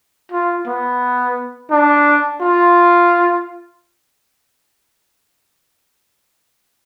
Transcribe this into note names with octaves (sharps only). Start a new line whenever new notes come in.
F4
B3
D4
F4